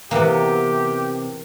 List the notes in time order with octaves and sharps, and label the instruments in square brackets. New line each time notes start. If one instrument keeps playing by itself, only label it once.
[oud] C3 B3 [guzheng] E3 A#3 [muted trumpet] G4